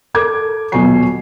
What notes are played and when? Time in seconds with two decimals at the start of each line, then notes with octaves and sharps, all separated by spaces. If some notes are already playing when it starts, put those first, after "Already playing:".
0.14 A4 A#4 D6 G#6
0.72 D#1 B2 F#3 G#5 C#6 C7